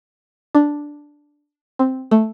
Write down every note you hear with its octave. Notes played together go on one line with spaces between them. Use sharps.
D4
C4
A3